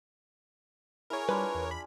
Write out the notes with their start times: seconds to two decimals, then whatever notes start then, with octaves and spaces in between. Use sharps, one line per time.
1.10 E4 G#4 A#4 C#5 G#5
1.29 G3 D4 F4 B4 B5
1.55 E2
1.71 B5